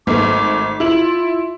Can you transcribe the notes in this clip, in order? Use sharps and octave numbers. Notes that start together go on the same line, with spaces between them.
G#1 A3 D6
E4 F4 F#7